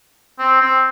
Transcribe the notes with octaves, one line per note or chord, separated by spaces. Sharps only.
C4
C4